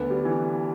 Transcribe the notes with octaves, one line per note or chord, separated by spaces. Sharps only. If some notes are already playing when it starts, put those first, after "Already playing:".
Already playing: D2 D3 B3
G3
E3